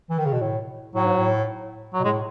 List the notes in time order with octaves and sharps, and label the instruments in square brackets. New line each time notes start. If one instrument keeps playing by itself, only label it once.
[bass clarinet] E3
D#3
C#3
B2
A2
[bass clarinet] A2 [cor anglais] F#3
[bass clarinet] G#2
A2
[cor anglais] F#3
[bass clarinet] B2
[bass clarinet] A2 [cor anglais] G#3